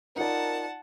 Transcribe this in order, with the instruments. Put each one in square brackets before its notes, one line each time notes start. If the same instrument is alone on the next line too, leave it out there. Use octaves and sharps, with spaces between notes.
[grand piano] D#4 F4 D5 [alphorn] A#4 [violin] F#5 A5